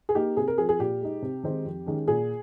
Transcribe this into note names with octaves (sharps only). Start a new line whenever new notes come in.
G#4
A#3 D#4 G4
C3 G#4
A#4
F3 C4 G#4
G#4
A#2 G4
G#3 D#4
C3
D#3 G#3 C4 D#4
F2
D#3 G#3 C#4
A#2 G#4